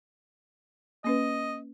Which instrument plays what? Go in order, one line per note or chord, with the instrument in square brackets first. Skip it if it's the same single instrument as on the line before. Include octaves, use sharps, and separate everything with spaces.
[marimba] A#3 C#4 B4 [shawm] D#5